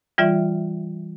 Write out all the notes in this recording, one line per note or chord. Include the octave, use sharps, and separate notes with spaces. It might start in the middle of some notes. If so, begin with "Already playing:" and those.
E3 G3 F4 D5 E5